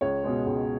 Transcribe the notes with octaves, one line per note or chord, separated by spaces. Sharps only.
C#2 C#5
B2 G#3
C#2